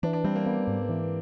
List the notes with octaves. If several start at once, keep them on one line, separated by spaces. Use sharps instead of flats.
E3 D4
D4
G3 C4
A#3
A#3 B3
G#2
E3